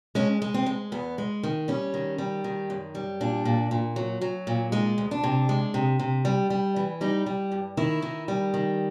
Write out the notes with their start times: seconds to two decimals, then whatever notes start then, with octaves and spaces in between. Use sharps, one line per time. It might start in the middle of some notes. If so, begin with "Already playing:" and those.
0.15 G#3 C#4
0.42 G#3
0.54 C4
0.66 G#3
0.92 E2 B3
1.18 G#3
1.43 D#3
1.68 G3 C#4
1.94 D#3
2.18 G3
2.44 D#3
2.70 F#2
2.95 G3
3.21 A#2 D4
3.45 A#2
3.71 A#2
3.96 F#3
4.21 F#3
4.47 A#2
4.72 G#3 D#4
4.98 D2
5.11 D4
5.24 C3
5.49 G#3
5.74 C3
5.99 C3
6.25 G3
6.50 G3
6.76 E3
7.01 G3 D#4
7.26 G3
7.52 G2
7.77 D#3 E4
8.02 D#3
8.28 G3
8.54 D#3